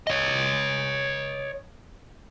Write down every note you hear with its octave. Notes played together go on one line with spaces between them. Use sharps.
C#5 D#5